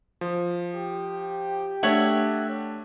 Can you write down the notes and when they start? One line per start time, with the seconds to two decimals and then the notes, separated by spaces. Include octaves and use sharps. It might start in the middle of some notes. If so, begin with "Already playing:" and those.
0.21 F3
0.74 G4
1.83 A3 D4 C#5 E5 F#5